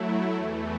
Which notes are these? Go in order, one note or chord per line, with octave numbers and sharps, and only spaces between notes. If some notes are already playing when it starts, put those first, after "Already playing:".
Already playing: F#3 A3 E4
E2 E3 A3